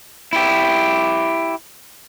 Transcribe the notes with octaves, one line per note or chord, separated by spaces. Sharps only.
E4 G4